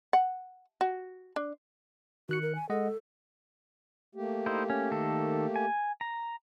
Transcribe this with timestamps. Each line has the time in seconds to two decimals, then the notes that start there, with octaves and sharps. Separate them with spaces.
0.13 F#5
0.81 F#4
1.36 D4
2.29 D#3 F#4 F#6 C#7
2.42 A#4
2.55 G#5
2.70 G#3 A4 D#5 F#5
4.15 A3 A#3 G4
4.46 D#4 E4 C5
4.70 C#4
4.91 D#3 A4
5.56 G#5
6.01 A#5